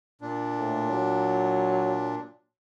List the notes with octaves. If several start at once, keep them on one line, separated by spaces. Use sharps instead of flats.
A#2 D4
A2
F#3